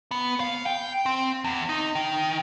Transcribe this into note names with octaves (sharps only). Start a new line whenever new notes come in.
B3
F5
G5
C4
E2
D#4
D#3